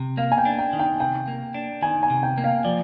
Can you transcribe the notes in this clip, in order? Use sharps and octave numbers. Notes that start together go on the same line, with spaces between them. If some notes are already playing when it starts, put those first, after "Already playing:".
Already playing: C3
A#3 F5
G#5
G5
D4
G5
D#3
G5
C3 G5
A#3
D4
D#3 G#5
G#5
C3
G5
A#3
F5
F3 D5